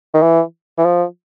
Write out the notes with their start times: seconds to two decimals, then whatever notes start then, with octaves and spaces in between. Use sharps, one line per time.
0.14 D#3
0.22 E3
0.78 E3
0.85 F3